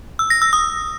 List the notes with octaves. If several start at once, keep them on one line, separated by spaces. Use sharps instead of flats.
E6
A#6
E6
D#6